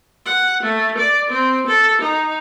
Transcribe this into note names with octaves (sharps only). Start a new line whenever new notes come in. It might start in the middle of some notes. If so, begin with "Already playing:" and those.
F#5
A3
D5
C4
A4
D#4